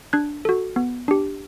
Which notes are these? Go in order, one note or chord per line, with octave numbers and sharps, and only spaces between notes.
D4 F#6 G#6
F#4 A4
B3
D4 G4